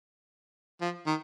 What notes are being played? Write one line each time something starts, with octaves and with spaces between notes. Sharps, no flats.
F3
D#3